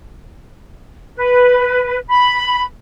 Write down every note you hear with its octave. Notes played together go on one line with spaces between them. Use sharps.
B4
B5